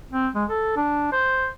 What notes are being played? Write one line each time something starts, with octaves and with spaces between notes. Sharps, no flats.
C4
G#3
A4
D4
C5